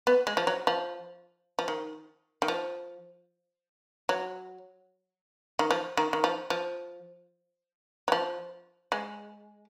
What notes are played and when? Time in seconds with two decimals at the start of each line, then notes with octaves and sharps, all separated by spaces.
0.07 B3
0.27 G#3
0.37 F3
0.47 F#3
0.67 F3
1.59 F3
1.68 D#3
2.42 D#3
2.48 F3
4.09 F#3
5.59 D#3
5.71 F3
5.97 D#3
6.13 D#3
6.24 F3
6.50 F3
8.08 F#3
8.12 F3
8.92 G#3